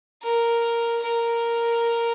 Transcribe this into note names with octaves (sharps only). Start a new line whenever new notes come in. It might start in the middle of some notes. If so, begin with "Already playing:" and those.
A#4
A#4